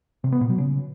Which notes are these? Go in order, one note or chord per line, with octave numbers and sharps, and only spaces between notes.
C3
B3
A#2
F#3
C#3